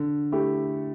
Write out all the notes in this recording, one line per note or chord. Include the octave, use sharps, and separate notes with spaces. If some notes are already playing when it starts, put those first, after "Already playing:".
Already playing: D3
A3 E4 G4